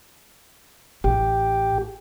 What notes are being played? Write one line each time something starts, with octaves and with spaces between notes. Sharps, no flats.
A1 G4